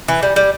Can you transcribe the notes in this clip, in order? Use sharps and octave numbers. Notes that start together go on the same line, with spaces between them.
E3
G3
G3